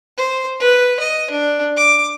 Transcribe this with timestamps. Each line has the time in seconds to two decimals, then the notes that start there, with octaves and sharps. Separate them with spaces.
0.17 C5
0.60 B4
1.00 D#5
1.30 D4
1.77 D6